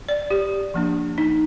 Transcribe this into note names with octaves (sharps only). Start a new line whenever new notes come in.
D5
G4
F3 A#3 D4
D#4